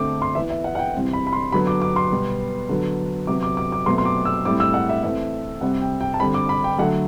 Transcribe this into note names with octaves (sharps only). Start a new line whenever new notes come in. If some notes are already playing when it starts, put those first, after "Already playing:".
Already playing: D3 A3 C4 D6
C6
E3 B3 E5
E5
F#5
F#5
G5
C3 E3 G3 C4
B5
B5
C6
D3 F#3 B3 B5
D6
D6
C6
B2 G3 B3
D3 F#3 B3
C3 F#3 B3 D6
D6
D6
D6
B2 F#3 A3 C4 C6
C6
D6
E6
A2 G3 C4 D6
E6
F#5
E5
E3 A3 C4 E5
C3 G3 C4 F#5
G5
G5
A5
D3 G3 C4 B5
D6
B5
G5
D3 F#3 A3 F#5